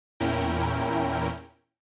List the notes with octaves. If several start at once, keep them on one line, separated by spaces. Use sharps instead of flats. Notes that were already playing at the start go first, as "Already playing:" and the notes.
E2 A#2 C#4 E4 A#4 G5